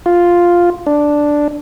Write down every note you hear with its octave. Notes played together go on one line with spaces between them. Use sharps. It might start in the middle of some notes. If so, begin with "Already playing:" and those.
F4
D4